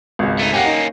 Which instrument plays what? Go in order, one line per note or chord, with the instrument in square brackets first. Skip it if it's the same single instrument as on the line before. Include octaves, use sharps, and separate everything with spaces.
[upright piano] G#1 C#2
[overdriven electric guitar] A3 D#4
[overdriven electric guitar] A#3 C#4 [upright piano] G4 F#5
[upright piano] D#4